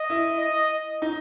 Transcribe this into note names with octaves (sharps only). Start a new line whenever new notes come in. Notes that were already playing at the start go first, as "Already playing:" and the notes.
Already playing: D#5
E4
D#5
D#4